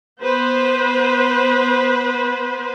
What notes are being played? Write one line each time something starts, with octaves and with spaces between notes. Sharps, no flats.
B3 B4 C5